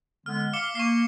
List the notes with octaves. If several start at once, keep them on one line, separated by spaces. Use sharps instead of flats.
D3 G#3 B3 F6
F5 D6 C#7 G7
A#3 C#6 D6 C7